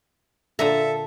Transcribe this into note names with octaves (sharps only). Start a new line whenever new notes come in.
A#2 D3 A4 E5 A#5